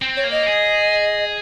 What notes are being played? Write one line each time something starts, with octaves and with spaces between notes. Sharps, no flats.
C4
C#5
A#3
D#5
G#4